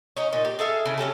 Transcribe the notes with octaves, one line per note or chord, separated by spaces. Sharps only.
C#4 D#4
A#2 D#4
G4
G#4 A4 E5 F5
C#3 E4
F#3 C#4 G4 A4